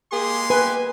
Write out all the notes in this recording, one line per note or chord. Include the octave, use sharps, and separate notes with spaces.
G#3 A#3 G4 G#4 C6
B4 G#5